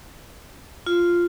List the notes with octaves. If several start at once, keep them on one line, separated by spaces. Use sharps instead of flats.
F4